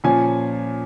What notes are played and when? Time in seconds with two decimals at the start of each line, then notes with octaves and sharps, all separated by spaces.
0.04 A#2 F3 C#4 G#5